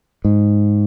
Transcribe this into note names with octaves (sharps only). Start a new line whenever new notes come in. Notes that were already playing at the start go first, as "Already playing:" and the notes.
G#2